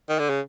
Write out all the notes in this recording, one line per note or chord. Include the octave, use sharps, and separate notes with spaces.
D#3
D3
C#3